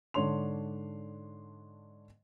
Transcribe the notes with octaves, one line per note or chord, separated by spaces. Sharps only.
G#2 D3 D4 C#5 C6 F7